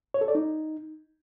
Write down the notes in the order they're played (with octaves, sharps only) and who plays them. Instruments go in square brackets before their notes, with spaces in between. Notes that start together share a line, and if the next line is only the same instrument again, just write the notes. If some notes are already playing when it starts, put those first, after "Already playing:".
[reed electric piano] C#5
A4
D5
D#4